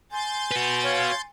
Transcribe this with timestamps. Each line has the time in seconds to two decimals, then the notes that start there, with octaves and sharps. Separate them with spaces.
0.12 G#5 C6 G6 A6
0.51 F#4 B4
0.84 C#5 F5